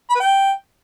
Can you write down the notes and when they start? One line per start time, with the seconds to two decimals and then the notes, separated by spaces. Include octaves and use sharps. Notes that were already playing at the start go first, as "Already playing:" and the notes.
0.10 B5
0.15 B4
0.20 G5